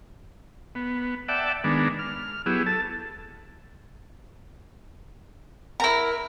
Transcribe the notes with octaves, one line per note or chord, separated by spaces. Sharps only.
B3
D5 E5 F#5 G5 A5
D#3 G#3 B3 D4
F6
F#3 B3 E4 G4 G#4
A4 A5
E4 A#4 A#5